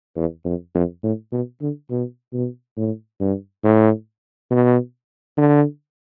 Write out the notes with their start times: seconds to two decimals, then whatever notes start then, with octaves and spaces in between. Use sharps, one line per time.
0.17 E2
0.45 F2
0.75 F2
1.03 A2
1.32 B2
1.61 D3
1.90 B2
2.33 B2
2.77 A2
3.20 G2
3.64 A2
4.51 B2
5.37 D3